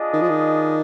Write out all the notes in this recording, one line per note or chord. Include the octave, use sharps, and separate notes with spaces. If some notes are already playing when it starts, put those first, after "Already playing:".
Already playing: D4 F4 G#4 D#5
D#3
F3
D#3